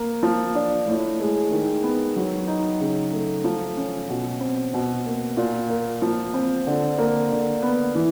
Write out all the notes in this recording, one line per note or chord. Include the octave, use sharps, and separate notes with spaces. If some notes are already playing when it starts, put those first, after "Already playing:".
Already playing: A#3
F3
D4
A2
G#3
D#3
B3
F#3
D#4
C#3
A3
F3
C#4
B2
C4
B2
A#3
A#2
A#3
F3
C4
D3
A#3
D3
B3
E3